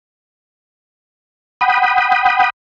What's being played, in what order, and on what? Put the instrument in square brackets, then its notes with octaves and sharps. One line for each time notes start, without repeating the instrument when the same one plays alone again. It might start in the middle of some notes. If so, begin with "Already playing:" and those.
[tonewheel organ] F#5 G5 B5 D#6